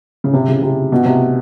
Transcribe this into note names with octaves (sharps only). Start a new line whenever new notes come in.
C#3
C3
C#3
C3
B2
C3